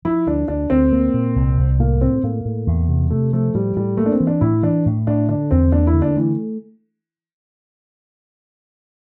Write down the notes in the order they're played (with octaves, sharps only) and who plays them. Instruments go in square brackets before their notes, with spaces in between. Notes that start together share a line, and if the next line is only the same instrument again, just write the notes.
[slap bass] F3 [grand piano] E4
[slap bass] D2 [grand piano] D4
[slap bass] D2 [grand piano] D4
[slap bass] D2 [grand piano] C4
[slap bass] A#3
A#2
C2
C2
[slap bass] A2 [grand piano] A#3
[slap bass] A2 [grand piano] C4
[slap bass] A2 [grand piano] A#3
[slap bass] A2
E2
C3
[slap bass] C3 [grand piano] A3
[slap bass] F3 [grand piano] A3
[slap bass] A2 [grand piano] G3
[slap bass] A2 [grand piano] G3
[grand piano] A3 [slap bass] A#3
[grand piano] D4
C4
[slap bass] E3
[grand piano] D4
[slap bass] A2 [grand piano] E4
[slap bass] E3 [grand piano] D4
[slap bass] A2
[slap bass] A2 [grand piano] D4
[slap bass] D3 [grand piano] D4
[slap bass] E2 [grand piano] C4
[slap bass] A#3 [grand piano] D4
[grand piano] E4
[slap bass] D3
[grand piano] D4
[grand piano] E3 [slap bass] A3